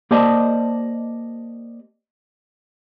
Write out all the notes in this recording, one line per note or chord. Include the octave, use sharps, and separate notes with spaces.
A#3 G4 C5 D5 D#5 A5